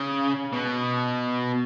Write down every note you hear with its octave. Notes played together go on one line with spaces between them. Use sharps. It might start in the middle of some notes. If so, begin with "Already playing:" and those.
Already playing: C#3
B2